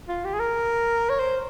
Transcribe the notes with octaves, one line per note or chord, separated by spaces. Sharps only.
F4
G4
G#4
A#4
C#5
C5